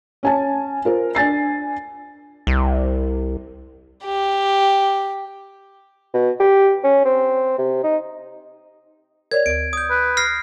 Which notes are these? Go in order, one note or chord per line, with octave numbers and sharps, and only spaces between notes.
C#4 G#5 A5
F4 A#4 C5
D4 G#5 A6 C7
C2
G4
B2
G4
C#4
C4
C3
D#4
A#4 C#5 D5 G#6
D2 D7
D#6 G6
B4
F6 A#6 C7